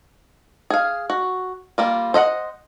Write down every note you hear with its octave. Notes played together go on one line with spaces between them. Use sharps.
G#4 F5
F#4
G3 A#3 F4
C5 D#5 F5 F#5